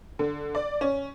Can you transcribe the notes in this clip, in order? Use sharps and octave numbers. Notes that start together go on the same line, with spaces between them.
D3
D5
C#4